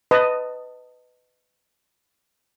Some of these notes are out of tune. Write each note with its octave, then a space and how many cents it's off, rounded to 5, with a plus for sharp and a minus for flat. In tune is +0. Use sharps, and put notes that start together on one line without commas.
B4 +20 D#5 +0 A5 +25